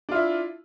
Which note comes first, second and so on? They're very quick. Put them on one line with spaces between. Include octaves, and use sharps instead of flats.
D4 F4 E4